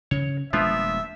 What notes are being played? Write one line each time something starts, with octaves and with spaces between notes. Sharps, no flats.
C#3 C#5
D#1 F3 G#3 B3 D4 F4 E5